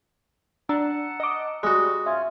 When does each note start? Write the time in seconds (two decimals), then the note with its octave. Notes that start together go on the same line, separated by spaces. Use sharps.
0.69 D4 F#5 A5 A#5 E6
1.20 D#5 D6
1.63 G3 G#3 F#4
2.06 C#4 F4 E5 G#5